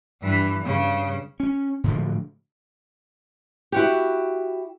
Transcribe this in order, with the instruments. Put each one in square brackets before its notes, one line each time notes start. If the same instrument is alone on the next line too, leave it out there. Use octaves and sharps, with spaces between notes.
[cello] G2 E3
G2 C#3
[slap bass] C#4
A2 D3 F3
[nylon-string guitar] E4 F#4 G4